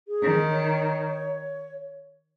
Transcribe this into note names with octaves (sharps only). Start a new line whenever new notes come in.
G#4
D#3
C#5